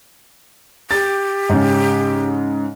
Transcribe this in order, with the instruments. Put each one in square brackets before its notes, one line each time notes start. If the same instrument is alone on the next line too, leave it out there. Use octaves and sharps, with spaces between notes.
[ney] G4 [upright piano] A6
[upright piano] G#2 C#3